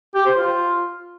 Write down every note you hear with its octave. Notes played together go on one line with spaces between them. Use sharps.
G4
C5
F4